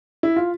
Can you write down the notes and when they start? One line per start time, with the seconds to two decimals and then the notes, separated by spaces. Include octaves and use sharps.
0.23 E4
0.36 F4